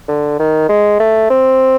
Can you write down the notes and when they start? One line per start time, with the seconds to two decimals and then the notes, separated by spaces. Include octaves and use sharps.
0.08 D3
0.39 D#3
0.69 G#3
1.00 A3
1.30 C4